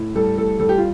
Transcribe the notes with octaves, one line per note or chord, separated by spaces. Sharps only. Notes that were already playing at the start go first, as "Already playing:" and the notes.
Already playing: A2
G3 A4
A2 A4
G3 A4
G4
F4